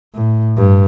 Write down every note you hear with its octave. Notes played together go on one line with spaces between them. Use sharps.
A2
G2